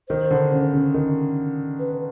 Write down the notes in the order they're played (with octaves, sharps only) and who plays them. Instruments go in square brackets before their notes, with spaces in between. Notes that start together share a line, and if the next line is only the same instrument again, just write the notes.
[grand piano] D#3 [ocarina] C5
[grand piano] D3
C#3
C#3
D#3
[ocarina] B4